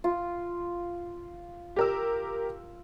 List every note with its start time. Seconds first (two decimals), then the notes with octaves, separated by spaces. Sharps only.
0.04 F4
1.76 G4 A#4 E6